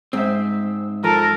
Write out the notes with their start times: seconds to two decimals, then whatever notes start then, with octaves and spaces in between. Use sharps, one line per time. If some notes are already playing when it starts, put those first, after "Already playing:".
0.13 G#2 C4 E5
1.04 F3 A4 A#4